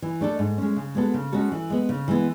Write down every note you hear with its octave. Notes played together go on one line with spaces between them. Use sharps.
E3
A3 D4 A4
G#2
G#3 C#4
C#3
G#3 B3 F#4 A4
C#3
G#3 C#4 F#4 A4
E3
G#3 B3
C#3
E3 G#3 B3